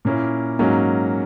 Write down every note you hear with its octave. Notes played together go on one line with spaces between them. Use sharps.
A#2 A#3 C#4 E4
G#2 F#3 A#3 C#4